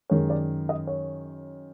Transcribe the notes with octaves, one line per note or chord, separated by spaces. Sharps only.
F#2 D#3 G#3 C#5
D5
D#5
C#5